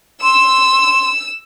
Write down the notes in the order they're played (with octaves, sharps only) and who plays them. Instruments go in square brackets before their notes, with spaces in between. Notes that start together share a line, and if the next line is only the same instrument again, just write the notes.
[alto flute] C6 [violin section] E6